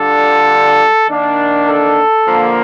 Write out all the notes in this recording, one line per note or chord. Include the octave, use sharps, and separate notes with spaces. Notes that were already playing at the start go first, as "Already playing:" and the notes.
Already playing: D3 G3 D4 F4 A4
D#3 A#3 D4
A4
D3 F3 A#3